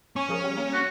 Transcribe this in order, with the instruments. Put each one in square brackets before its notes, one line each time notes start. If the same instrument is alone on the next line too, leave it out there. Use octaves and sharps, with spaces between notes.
[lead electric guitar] C#4 [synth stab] C#5 G#5 C#6
[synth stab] F3 G#4 A#4
G3
A#3
[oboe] F#4